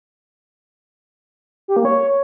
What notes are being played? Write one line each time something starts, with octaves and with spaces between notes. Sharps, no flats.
G4
A#3
C#5